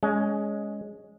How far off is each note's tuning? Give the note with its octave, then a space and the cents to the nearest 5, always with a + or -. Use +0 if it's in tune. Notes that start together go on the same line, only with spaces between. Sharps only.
G#3 +0 C#4 +20